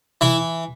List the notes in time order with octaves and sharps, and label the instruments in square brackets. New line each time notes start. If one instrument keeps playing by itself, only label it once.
[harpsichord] E3 E4